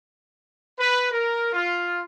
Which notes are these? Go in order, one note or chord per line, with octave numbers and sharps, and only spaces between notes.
B4
A#4
F4